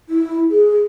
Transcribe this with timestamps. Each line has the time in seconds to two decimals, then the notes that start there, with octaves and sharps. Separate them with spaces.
0.09 E4
0.51 G#4